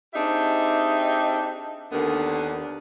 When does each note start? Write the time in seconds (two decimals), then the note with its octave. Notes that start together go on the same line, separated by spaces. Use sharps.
0.14 C4 D4 D#4 G4 G#4 E5
1.91 D#2 D3 A#3 B3 D4